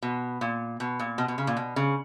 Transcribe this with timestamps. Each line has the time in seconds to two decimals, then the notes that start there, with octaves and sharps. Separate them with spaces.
0.02 B2
0.41 A#2
0.80 B2
1.00 A#2
1.18 B2
1.28 B2
1.38 C#3
1.47 A#2
1.57 B2
1.76 C#3